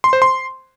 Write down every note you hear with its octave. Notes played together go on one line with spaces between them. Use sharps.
C6
C5
C6